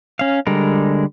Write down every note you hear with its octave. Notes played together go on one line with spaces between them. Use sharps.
C#4 F5
D3 G3 G#3 A#4